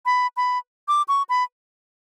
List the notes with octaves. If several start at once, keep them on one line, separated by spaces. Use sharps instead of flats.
B5
B5
D6
C#6
B5